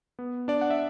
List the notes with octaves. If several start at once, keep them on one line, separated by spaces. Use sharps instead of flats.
B3
D4 D5
F#5
E5